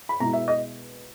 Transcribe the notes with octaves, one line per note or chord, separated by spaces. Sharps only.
B5
B2 G#3 B3 E4 A#5
E5
D#5